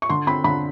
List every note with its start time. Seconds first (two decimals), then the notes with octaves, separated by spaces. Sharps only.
0.02 C#6
0.09 D3 C6
0.27 C4 B5
0.44 D3 B5